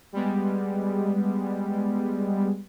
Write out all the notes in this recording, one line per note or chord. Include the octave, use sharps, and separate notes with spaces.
G3 G#3 B3